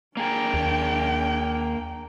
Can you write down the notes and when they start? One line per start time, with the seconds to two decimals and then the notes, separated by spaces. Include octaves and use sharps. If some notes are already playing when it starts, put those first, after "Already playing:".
0.17 A#3 D4 G#4 A#4 G5
0.54 D#2